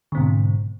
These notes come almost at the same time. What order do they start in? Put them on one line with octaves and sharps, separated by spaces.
D3 C4 B2 G#2